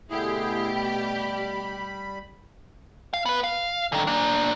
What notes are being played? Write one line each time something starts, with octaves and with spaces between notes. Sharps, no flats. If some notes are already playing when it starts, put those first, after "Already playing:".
B2 D3 A3 E4 G4 G#4
G3 B5
F5
B3 B4
F5
D3 D#3
A#3 D4